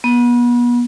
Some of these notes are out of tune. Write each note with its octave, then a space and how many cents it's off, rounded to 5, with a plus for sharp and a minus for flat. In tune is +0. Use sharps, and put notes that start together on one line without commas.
B3 -35